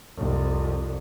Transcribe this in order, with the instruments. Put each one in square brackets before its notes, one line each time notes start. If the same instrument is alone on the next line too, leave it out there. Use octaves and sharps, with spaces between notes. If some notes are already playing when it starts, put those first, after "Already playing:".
[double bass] C2 F2